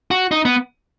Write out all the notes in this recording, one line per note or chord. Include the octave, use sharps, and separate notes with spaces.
F#4
D#4
B3